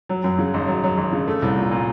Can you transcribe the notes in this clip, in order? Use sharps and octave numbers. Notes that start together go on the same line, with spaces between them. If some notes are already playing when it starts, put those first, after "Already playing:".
F#3
F#2
C#3
G#1
F#3
F#3
G#1
C#3
A3
C2
A#2
A#2